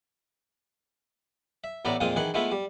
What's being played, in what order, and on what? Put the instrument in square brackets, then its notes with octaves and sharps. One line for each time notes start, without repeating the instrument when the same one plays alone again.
[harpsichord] E5
A1 A2 B3 D5 E5 A#5
F2 A#2 G#3 C4 F4 D#6
D#3 E3 G#4 F#5
G#3 A3 B3 E4 F4 E5
G3